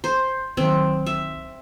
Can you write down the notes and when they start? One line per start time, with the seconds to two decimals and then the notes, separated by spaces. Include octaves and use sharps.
0.04 C5
0.57 C2 D#3 F#3 C4
1.06 E5